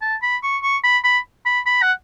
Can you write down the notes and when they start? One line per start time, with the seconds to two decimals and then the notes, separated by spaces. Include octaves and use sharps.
0.02 A5
0.22 B5
0.43 C#6
0.63 C#6
0.84 B5
1.04 B5
1.46 B5
1.66 B5
1.82 F#5